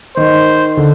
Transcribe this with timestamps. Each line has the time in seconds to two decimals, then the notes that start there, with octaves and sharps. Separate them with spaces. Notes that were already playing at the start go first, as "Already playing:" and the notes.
0.17 D#3 C5
0.77 D3